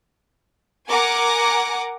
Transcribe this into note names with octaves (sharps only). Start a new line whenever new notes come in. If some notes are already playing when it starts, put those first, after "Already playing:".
A#4 F#5 G#5 A#5 D6